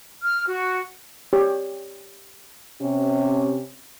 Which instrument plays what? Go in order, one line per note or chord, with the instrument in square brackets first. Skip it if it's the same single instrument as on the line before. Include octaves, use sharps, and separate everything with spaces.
[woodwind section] F6
F#4
[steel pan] G4 C#5
[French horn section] C3 C#4